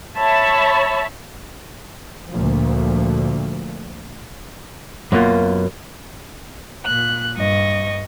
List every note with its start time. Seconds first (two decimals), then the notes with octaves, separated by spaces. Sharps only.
0.17 C#5 E5 A5 B5
2.30 D2 A#2 F3
5.12 F#2 B2 A#3 F4
6.85 A#2 F#6
7.36 G2 D#5 C#6